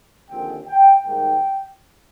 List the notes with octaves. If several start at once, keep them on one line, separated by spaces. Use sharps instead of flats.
D#2 D3 F3 G#3 C4 G5
G5
G#2 D#3 G3 A#3 G5